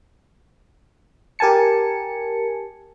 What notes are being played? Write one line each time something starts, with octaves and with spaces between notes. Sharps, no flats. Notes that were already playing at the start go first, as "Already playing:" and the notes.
G4 A#4 G#5 A5 C#7